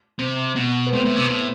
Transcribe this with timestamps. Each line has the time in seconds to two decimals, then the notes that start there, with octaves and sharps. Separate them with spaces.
0.19 C3
0.56 B2
0.87 B3
0.92 A2 C4
1.05 A2
1.17 C3
1.24 B2
1.29 A2